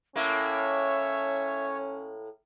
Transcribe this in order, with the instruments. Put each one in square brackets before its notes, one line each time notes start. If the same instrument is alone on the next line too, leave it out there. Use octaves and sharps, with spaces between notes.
[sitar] A2 A#3 [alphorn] C#4 [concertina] C#5 [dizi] E5